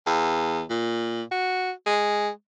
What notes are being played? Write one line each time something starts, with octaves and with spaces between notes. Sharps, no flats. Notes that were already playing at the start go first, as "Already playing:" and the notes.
E2
A#2
F#4
G#3